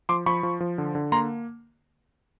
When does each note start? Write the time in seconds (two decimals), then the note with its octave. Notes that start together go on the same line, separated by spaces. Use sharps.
0.09 F3 C6 D6
0.26 F3 B5 C#6
0.43 F3
0.60 F3
0.78 D3
0.95 D3
1.12 A#3 A#5 C6